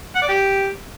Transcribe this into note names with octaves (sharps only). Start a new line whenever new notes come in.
F#5
D5
G4